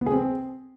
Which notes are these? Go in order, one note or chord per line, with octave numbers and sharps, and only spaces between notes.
B3
G#4
C4